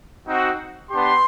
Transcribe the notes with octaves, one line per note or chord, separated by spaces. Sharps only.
C4 D#4 F#4
B3 D4 G4 C6